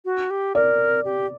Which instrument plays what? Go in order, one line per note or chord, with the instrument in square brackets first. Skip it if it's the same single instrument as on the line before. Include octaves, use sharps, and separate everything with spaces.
[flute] F#4
G4
[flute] A#4 [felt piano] D5
[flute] G4